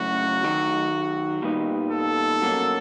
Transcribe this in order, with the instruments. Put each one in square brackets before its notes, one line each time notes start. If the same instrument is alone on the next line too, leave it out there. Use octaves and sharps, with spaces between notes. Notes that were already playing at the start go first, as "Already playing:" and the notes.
Already playing: [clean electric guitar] C#3 F#3 A3 C#4 E4 [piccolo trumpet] F#4
[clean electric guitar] F#2 D#3 F#3
A#2 G3 B3 D#4
[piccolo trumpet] A4
[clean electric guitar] B1 B2 F#3 A#3 C#4